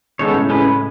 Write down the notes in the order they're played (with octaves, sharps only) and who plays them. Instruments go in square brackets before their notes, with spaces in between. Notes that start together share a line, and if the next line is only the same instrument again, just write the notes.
[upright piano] C#3 [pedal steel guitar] G#3 B3 D#4 A4 C#5
[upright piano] A2
[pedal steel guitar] G#3 C#4 E4 B4